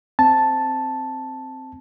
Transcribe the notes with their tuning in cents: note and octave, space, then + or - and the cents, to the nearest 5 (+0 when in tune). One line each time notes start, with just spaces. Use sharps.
C4 +0 A5 +0